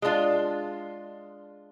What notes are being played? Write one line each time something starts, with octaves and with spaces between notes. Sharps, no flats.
G#3 D4 F4